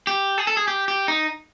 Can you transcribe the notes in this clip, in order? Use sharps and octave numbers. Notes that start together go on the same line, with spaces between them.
G4
G#4
A4
G#4
G4
G4
D#4